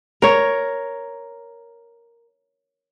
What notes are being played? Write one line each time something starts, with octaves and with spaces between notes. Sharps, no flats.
A#4 C#5